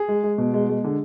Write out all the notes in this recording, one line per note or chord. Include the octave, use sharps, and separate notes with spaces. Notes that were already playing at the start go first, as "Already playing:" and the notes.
Already playing: G#4
G#3
G#3
B2
G#3
G#3
D3